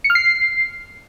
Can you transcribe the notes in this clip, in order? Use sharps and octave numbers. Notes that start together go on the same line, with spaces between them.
C#7
F6
C7